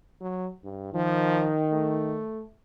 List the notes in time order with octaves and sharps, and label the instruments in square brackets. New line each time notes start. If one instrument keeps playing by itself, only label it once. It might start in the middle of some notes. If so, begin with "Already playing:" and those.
[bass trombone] F#3
G2
[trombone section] D#3 [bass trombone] F3
[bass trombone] A3